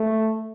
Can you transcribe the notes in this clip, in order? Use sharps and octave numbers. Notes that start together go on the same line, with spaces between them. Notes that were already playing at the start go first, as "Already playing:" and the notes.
Already playing: A3